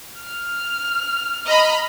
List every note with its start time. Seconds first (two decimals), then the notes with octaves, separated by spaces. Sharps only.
0.21 F6
1.44 D#5 A#5 B5